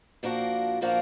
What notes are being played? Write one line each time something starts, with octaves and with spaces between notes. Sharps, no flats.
A#2 F3 A#3 D4 F#4
A#2 F3 A#3 D4 F#4